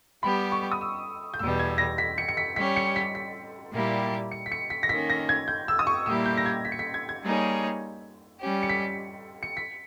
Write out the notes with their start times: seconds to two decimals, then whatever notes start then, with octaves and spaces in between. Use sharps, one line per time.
0.23 G3 B3 G4 B5
0.52 C#6
0.72 D#6
0.81 E6
1.34 G6
1.39 E2 B2 G3 E6
1.59 G#6
1.78 A#6
1.98 B6
2.18 C#7
2.28 C#7
2.37 B6
2.56 G3 C#4 G4 C#5 B6
2.76 C#7
2.96 B6
3.15 B6
3.73 A#2 G3 A#3 E4 G4
4.31 C#7
4.46 B6
4.52 C#7
4.70 B6
4.83 A#6
4.89 D#3 A#3 C#4 B6
5.10 A#6
5.29 G#6
5.48 G6
5.68 E6
5.79 D#6
5.87 C#6
6.06 A#2 G3 A#3 E4 G4 E6
6.26 G6
6.38 A#6
6.46 G#6
6.65 B6
6.72 C#7
6.79 B6
6.94 G#6
7.09 G#6
7.23 G3 A#3 D#4 G#4 C#5
8.40 G3 C#4 G4
8.63 C#7
8.69 B6
9.43 C#7
9.57 B6